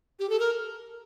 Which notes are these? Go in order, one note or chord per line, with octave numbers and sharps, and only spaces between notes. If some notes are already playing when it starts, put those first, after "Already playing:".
G4
A4
A#4